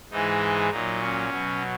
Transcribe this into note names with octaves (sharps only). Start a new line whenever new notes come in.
G#2 E3 G#3 D#4
A#2 F#3 D#4
C#4
B2 F#3